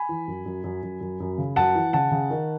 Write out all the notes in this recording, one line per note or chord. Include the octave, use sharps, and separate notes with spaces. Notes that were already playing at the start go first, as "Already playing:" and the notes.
Already playing: G#5 B5
E3
F#2
F#2
F#2
F#2
F#2
F#2
C#3
F#2 F#5 A5
E3
C#3 F#5 A5
C#3
D#3